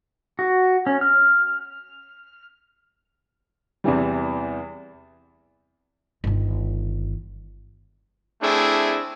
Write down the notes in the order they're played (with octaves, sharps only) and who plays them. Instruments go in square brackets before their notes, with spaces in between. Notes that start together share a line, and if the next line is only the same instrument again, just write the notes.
[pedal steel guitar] F#4
C#4
F6
[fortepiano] E2 C3 E3 G3
[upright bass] G1 D#3
[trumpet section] A3 C4 D4 E4 G#4